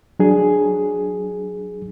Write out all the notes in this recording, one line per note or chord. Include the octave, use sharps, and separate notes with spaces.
F#3 D4 G#4